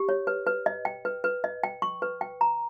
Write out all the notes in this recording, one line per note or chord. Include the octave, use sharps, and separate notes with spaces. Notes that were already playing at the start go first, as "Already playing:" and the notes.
Already playing: G4
C#5
B4
B4
D#5
G5
B4
B4
D#5
G5
C#6
B4
G5
A#5